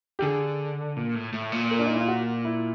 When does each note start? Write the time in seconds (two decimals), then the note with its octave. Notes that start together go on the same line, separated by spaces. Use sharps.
0.19 G4
0.22 D3 G#4
0.96 A#2
1.15 A2
1.33 A2
1.52 A#2
1.71 A#4
1.79 D4
1.86 D#4
1.93 E4
2.00 F4
2.08 F#4
2.45 E4